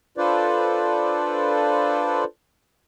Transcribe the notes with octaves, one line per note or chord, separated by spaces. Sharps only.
D4 F4 A4 B4 C5 D5